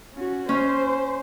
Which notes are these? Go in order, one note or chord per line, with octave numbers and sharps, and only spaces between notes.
C#4 F#4
C#4 C5